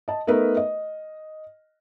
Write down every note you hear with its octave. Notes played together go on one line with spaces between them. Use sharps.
D#5 A5
A3 B3 D#4 A#4 B4
D#5